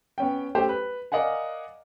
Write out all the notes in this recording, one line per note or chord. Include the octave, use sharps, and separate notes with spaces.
B3 C#4 G5
A3 C#4 G4 C5
B4
A#4 D5 D#5 F5 F#5 G#5